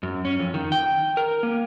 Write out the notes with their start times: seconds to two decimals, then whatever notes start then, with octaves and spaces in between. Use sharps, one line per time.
0.03 F#2
0.25 C#4
0.39 F2
0.54 D#3
0.72 G5
1.17 A#4
1.43 A#3